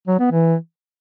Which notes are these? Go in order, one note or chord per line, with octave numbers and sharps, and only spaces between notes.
F#3
B3
E3